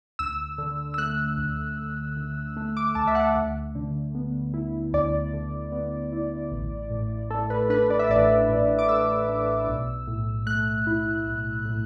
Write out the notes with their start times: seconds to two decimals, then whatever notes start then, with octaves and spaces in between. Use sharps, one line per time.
0.19 D2 E6
0.58 D3
0.94 E6
0.98 A3 F#6
1.38 D2
1.77 D2
2.17 D3
2.57 A3
2.77 D6
2.95 D2 A5
3.07 E5
3.15 F#5
3.36 D2
3.75 D3
4.15 B3
4.54 E4
4.93 D2 D5
5.34 D3
5.72 B3
6.13 E4
6.52 A1
6.90 A2
7.30 A3 A4
7.50 B4
7.70 D4 B4
7.90 D5
7.99 E5
8.09 A1 D5
8.49 A2
8.79 D6
8.89 A3 E6
9.29 D4
9.68 B1
10.07 A2
10.46 A3 F#6
10.87 E4
11.26 B1
11.65 A2